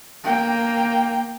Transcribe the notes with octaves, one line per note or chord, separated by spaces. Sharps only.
A#3 G5